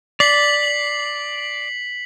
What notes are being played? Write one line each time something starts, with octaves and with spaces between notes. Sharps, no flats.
D5 B6 C7 F#7